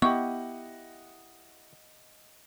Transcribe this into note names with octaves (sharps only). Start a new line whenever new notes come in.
B3 E4 G4 D#5 F#5 C#6